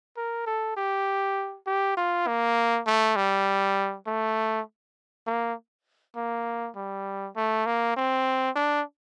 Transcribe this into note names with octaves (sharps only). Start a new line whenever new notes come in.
A#4
A4
G4
G4
F4
A#3
A3
G3
A3
A#3
A#3
G3
A3
A#3
C4
D4